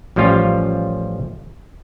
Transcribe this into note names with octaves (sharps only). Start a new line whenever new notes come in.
A1 F3 G3 C#4 F4 F5